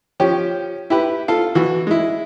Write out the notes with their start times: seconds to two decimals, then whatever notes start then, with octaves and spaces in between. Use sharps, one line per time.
0.20 F3 C#4 G4
0.90 E4 G4 B4
1.28 F4 A4 F5
1.55 E3 F#4
1.87 G#3 E4